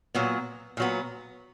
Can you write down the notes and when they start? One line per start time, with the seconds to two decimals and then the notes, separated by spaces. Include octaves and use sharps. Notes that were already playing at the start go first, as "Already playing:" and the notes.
0.14 A#2 F#3 B3
0.77 A#2 F#3 B3